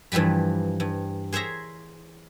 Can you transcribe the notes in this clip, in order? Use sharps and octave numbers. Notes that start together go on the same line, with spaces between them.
G2 E3 F3 G3 B5
G2
G#4 C5 C#5 E5 A#5